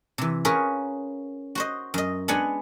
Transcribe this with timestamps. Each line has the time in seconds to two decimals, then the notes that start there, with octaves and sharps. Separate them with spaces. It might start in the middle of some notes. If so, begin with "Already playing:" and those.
0.18 C3 E3
0.45 C#4 F4 G#4 A#4 B4 C#5
1.55 F#4 C5 D#5
1.94 F#2 D#5
2.28 G#3 B3 D4 G#4 F#5 G#5